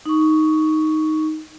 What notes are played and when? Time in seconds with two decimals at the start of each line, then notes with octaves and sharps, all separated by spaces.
0.06 D#4 C#6